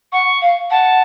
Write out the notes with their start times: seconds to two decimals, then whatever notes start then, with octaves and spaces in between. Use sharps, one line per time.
0.12 F#5 C#6
0.42 F5
0.70 F#5 A5